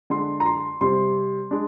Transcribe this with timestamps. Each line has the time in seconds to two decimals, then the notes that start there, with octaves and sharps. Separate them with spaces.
0.10 D3 G#3 D4 C6
0.40 A#5
0.46 C6
0.81 C3 G3 C4 C6
1.51 G#3 D4